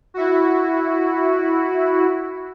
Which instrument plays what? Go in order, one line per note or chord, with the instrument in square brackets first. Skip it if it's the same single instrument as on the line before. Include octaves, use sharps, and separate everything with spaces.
[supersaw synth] E4 F#4